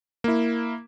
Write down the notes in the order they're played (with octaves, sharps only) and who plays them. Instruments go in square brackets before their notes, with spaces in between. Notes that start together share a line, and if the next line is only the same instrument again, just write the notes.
[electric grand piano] A#3 E4